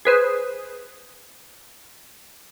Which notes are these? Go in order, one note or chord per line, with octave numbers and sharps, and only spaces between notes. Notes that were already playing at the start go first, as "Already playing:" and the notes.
G#4 B4 C5